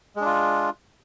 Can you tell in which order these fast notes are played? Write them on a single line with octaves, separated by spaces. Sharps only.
G#3 D4 F4